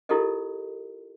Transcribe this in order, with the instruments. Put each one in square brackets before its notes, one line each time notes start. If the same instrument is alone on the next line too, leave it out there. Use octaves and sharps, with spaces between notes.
[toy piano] E4 F4 G4 A4 A#4 D#5